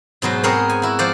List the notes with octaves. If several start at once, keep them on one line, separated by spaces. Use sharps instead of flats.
G#2 B2 F#3 C5
B3 C4 G#4 A#4 C5 C#5
G#5
E4 F#4
F3 C5 D5